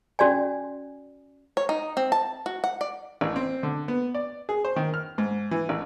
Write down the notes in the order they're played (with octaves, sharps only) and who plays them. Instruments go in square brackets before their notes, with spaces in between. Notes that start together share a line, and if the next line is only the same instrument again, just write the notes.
[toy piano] C#4 F#4 D5 G#5
[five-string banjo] C#5
D#4
C4
A5
F#4
F#5
D5
[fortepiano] A1
C4
D3
B3
D5
G#4
C5
D#3
F6
G#2
E3
A1